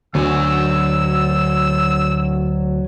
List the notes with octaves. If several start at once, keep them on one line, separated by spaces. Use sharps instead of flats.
D2 F#3 G#5 E6